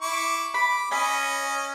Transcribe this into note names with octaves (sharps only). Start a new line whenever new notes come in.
E4 C#6 D6
B5 D6
C#4 C#5 D#5 G#5 B5